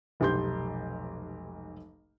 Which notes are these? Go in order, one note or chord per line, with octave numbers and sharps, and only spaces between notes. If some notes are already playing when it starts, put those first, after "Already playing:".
F1 B1 G#2 G4 C6 G6